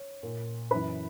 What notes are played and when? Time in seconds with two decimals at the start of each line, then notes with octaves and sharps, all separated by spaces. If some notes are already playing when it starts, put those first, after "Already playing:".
Already playing: C#5
0.23 A#2
0.71 F#2 E3 B4 B5